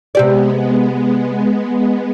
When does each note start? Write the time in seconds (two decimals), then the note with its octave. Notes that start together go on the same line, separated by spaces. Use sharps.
0.15 C3 G#3 B3 G4 D5